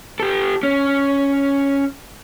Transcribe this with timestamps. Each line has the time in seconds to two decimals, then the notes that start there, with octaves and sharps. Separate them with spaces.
0.20 G4 A4
0.63 C#4